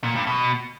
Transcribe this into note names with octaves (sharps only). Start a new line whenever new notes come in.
A#2
G2
B2